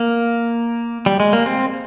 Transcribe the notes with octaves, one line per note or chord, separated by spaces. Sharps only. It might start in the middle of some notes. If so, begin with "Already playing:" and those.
Already playing: A#3
G3
G#3
A#3
C4